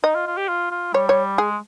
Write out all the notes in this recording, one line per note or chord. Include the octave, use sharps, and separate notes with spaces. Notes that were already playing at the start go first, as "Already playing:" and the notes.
D#4 D#5
F4
F4
G4
F4
F4
G3 C#5
C#5
G#3 G#4